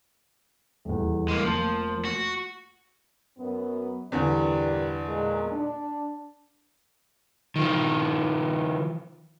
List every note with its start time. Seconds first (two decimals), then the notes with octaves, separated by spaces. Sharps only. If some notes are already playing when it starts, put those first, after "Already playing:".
0.85 D#1 E2
1.28 G#3 A#3
1.45 F1 F3 A#3 A5
2.05 F#4
3.39 F#2 B3
4.12 E2 G2 A#2 D3 D5
5.07 A#2 G#3
5.52 D4
7.56 D#3 F3